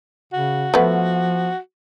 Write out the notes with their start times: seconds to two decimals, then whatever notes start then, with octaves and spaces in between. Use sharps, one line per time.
0.33 C#3 F#4
0.74 F3 A3 B3